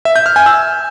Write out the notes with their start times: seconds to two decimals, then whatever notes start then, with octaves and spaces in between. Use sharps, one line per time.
0.05 E5
0.16 G6
0.26 F6
0.36 G#5
0.46 E6